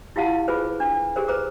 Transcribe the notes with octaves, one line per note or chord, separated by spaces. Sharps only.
E4 F4 G4 F5 F#5 A5
F4 G#4 B4 C5
D4
G4 G#4 A#4 C5
B4 C5 A#5 D6